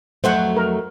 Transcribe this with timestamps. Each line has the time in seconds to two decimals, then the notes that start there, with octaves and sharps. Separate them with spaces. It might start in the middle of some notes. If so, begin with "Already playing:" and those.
0.24 F2 F#3 A3 C5 F#5
0.57 A#4